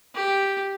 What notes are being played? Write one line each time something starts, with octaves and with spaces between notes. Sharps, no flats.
G4